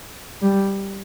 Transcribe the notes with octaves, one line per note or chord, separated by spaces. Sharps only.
G3